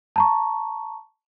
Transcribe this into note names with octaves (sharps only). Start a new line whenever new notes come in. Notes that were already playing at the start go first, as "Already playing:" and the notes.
A5 A#5 C#6